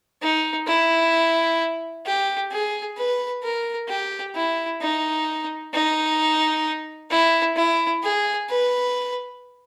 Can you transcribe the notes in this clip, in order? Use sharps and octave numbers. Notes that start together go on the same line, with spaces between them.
D#4
E4
G4
G#4
B4
A#4
G4
E4
D#4
D#4
E4
E4
G#4
B4